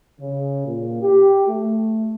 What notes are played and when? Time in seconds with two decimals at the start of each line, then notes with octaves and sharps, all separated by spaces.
0.20 C#3
0.66 A#2
1.02 G4
1.48 A3